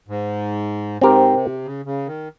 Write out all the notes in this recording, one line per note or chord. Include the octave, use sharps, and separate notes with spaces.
G#2
G#2 C4 G4 A#4
C3
C#3
C#3
D#3